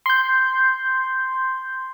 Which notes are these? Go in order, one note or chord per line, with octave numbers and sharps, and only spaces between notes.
C6 G6